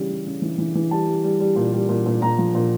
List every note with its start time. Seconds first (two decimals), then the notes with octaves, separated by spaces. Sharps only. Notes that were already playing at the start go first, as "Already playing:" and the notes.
Already playing: C#3 E3 G3
0.10 C#3
0.26 C#3
0.42 E3
0.58 E3
0.75 E3
0.91 G3 A5
1.08 G3
1.24 G3
1.40 G3
1.56 A#2
1.72 G3
1.89 A#2
2.06 A#2
2.21 A#2 A#5
2.38 F3
2.55 A#2